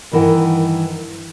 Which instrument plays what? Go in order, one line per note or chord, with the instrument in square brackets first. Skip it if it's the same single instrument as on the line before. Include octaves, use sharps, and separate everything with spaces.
[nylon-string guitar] G2 D#3 E3 A#4 F#5